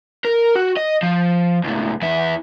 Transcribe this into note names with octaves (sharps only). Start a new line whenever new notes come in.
A#4
F#4
D#5
F3
C#2 A2
E2 E4